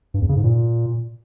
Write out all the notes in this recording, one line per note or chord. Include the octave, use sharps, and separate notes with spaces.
G2
E2
C#3
G#2
A#2